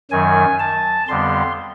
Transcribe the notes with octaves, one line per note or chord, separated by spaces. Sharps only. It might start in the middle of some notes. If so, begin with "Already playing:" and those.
F#2 D#3 F#3 G#5
A5
F2 D3 G3 B3 C6